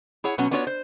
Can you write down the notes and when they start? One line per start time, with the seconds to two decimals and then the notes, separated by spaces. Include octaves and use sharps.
0.24 E4 G#4 C#5 F#5
0.38 B2 F#3 B3 C#4 F#5
0.51 B3 D4 F4 F#4 B4 C#5
0.67 C5